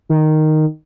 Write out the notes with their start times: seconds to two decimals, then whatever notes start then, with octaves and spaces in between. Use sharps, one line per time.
0.09 D#3